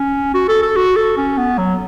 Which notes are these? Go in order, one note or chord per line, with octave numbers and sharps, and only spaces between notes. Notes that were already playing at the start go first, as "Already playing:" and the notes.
Already playing: C#4
F#4
A4
A4
F#4
A4
C#4
B3
F#3